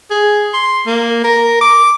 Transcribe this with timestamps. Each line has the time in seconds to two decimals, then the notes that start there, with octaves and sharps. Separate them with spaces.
0.11 G#4
0.54 C6
0.87 A#3
1.24 A#4
1.61 D6